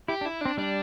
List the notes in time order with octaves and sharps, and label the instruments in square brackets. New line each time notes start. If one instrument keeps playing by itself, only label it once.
[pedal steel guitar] E4 [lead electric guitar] G4
[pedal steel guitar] D4
[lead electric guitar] E4
[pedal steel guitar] C4 [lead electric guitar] D4
[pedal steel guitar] G3 [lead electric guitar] D4